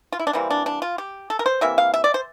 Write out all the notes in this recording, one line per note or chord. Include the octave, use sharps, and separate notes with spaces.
F4
E4
D4
C3 E3 G3 A#3 C4
D4
D4
F4
G4
A4
A#4
C5
C3 E3 A#3 E5
F5
E5
D5
C5